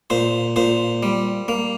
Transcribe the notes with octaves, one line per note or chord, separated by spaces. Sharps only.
A#2 C5
A#2 C5
G3
A#3